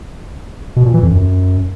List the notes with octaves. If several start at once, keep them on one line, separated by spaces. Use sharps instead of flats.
B2
A#2
E3
F2
F#2